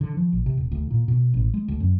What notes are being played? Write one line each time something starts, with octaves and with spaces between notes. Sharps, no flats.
D3
F3
A#1
C3
D#1
D2
A#2
B2
A1
G#3
D2
F#2